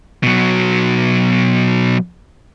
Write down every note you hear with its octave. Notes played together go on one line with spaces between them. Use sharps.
B2 F#3